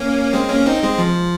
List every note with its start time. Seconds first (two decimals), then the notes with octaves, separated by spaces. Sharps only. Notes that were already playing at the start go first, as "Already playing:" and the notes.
Already playing: A#3 C#4
0.33 G#3 C4
0.49 A#3 C#4
0.66 C4 D#4
0.83 G#3 C4
0.98 F3